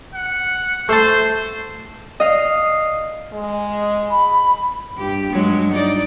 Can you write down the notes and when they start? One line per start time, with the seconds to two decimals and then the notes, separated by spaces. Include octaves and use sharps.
0.14 F#5
0.89 A3 C5 A5
2.20 D#5 F5
3.33 G#3
4.11 B5
4.97 G2 G4
5.31 G2 F#3 G#3
5.72 D#4 D5